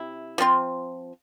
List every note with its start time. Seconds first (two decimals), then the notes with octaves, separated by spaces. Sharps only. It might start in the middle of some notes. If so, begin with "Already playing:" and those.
Already playing: C3 E4
0.38 F3 C4 F4